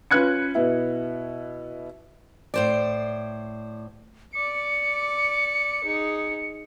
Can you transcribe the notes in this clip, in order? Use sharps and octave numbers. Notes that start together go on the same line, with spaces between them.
C#4 F4 B4 F#6 G#6 C#7
B2 B3 E4
A2 C5 D5
D5 D6 C#7
D#4 G#4